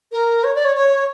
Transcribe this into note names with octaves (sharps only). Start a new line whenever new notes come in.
A#4
C#5
D5
C#5
C#5